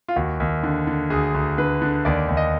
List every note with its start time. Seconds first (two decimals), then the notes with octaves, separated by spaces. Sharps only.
0.08 F4
0.16 D#2 F#4
0.40 D#2
0.63 D3
0.87 D3
1.10 D2 G#4
1.34 D2
1.58 D3 B4
1.82 D3
2.05 D#2 D5
2.29 D#2
2.37 D#5